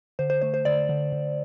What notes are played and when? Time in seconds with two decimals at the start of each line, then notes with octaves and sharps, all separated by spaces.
0.19 D3 C5
0.30 C5
0.42 A3 C5
0.54 C5
0.65 D3 D5
0.89 D3
1.12 D3